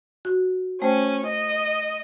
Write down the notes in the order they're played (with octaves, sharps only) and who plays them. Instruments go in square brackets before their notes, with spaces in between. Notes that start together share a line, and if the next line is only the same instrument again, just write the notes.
[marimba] F#4
[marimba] A3 C5 G5 [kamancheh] C#4
[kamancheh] D#5